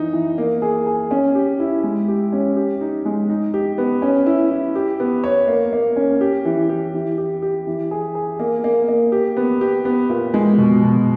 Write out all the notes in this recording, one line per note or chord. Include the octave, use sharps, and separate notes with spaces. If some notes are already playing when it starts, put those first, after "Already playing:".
Already playing: E3 D#4
E3
A#3
G#4
G#4
C#4
G4
E4
G#3
G4
C#4
G4
D#4
G#3
D#4
G4
B3
C#4
E4
E4
G4
B3
C#5
A#3
A#3
C#4
G4
E3
G4
E3
G4
G4
E3
G#4
G#4
A#3
A#3
A#3
G4
B3
G4
B3
A#2
G#3
B2
B2